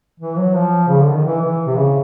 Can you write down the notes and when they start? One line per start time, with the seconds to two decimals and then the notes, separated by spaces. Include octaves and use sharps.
0.20 E3
0.38 F#3
0.55 F3
0.88 C#3
1.00 D3
1.12 D#3
1.25 E3
1.42 E3
1.67 C3
1.77 C#3